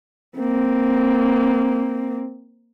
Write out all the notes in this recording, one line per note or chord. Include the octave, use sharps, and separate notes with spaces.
A#3 C4